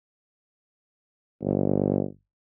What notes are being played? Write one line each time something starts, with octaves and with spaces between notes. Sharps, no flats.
G1